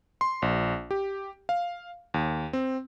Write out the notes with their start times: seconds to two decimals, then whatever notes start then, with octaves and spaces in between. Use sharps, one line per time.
0.21 C6
0.42 A#1
0.91 G4
1.49 F5
2.14 D#2
2.53 C4